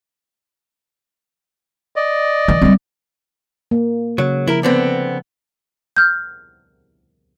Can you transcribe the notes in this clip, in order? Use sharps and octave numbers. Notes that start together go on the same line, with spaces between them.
D5 D#5
E3
G3 C4
A#3
C#3 F#3
F3 E4 A#4
D3 B3 C4
F6 G6